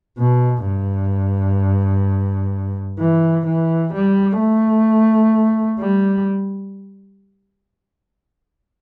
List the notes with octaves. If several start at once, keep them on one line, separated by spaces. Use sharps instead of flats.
B2
G2
E3
E3
G3
A3
G3